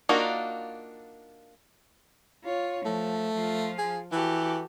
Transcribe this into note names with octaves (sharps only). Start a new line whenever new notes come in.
A#3 D4 D#4 F4 F#4
F4 C#5
F3 A3
F3 F4
G#4
E3 F#4 G4 A4